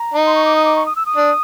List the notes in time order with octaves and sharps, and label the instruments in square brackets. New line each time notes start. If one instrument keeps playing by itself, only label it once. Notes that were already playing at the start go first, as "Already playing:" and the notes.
Already playing: [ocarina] A#5
[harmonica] D#4
[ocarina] C6
C#6
D6
D#6
D6
C#6
D#6
E6
D#6
[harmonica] D4